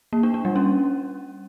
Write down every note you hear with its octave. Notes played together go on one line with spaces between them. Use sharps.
A#3
D4
D4
G3
C#4